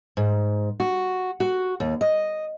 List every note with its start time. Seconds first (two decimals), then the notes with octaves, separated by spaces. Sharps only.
0.17 G#2
0.80 F#4
1.40 F#4
1.80 D#2
2.01 D#5